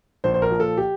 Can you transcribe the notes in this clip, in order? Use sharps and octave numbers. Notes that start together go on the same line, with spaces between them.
A#1 C5
C5
A#4
A#2 F3
A4
G4